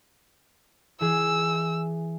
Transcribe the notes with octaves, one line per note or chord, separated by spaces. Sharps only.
E3 G#4 E6